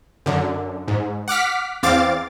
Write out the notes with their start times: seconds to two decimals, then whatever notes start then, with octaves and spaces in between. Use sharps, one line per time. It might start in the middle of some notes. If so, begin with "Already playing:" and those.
0.26 F#2 D3
0.88 G#2
1.28 F#5 D6 F6 B6
1.83 E2 C4 F5 D6 A6